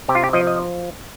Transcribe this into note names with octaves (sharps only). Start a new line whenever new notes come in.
C3 G4
F4
G4
F3 D#5
D#5